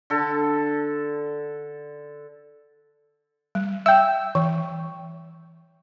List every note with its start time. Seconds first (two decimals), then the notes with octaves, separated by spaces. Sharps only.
0.10 D3 A4
3.55 G3
3.86 E5 G5 E6
4.35 E3